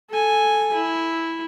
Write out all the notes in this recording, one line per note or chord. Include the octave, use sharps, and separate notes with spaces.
A4 G#5
E4